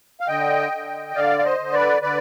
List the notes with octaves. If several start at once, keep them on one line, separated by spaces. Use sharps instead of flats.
F5
D3 D#5 G5
D3
D3 D5 F5
F5
C5 D#5
D3
B4 D5
D3 B4 D5